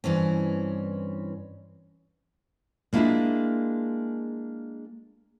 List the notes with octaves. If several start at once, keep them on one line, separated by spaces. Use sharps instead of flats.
G2 E3 C4 C#4
G#3 A#3 D4 E4 F4 G#4